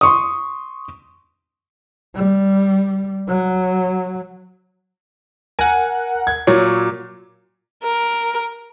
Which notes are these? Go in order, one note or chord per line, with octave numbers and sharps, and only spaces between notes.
C6 C#6 D#6
G3
F#3
A#4 F#5 G#5
G#6
A#2 F#3 C#5
A#4